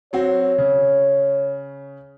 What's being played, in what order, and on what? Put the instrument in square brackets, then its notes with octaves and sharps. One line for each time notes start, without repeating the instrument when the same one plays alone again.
[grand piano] F#3 C4 F#4 [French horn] C#5
[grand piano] C#3